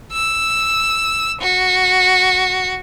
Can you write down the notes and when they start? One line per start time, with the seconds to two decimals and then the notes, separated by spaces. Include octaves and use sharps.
0.12 E6
1.41 F#4